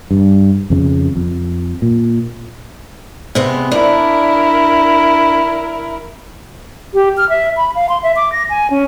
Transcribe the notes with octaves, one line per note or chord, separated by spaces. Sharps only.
G2
F2 C#3
F2
A#2
C3 G#3 B3
D4 E4 A#4
G4
F6
E5
B5
F5
C6
E5
D6
A#6
G#5
C#4